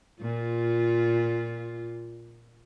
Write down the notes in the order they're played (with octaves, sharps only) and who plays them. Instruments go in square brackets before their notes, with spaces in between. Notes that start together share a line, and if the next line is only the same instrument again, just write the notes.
[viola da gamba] A#2 F4